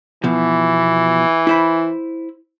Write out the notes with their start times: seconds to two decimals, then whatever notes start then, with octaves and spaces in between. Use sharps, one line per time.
0.24 B2 E3 F3
1.47 E4 C5 B5